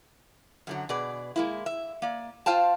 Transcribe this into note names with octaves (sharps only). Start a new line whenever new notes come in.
F#2 D3 F#3
B2 G#4 B4 D5
G#3 A#3 E4
E5
A#3 D5
F4 C5 F5 G5 A5